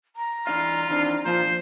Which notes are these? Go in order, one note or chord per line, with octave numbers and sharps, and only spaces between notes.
A#5
E3 D4 F4 F5
D#3 E3 C4 D4
A#2 F3 C5